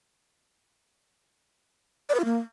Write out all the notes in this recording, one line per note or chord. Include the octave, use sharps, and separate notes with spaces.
D5
B4
F4
A#3